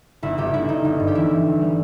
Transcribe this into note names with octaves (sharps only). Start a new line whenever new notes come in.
G1 E4
G1 G4
G1 E4
G1 D#4
G1
G2
G4
E3 E4
E3
G1
G3